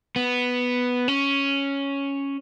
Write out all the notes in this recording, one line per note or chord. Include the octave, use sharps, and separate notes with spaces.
B3
C#4